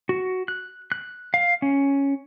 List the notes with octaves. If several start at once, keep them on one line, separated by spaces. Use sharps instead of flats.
F#4
F#6
F#6
F5
C#4